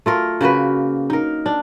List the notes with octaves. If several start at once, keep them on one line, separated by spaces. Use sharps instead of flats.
A3 F4 A#4
C#3 A#3 F#4 B4
D#4 A#4
D4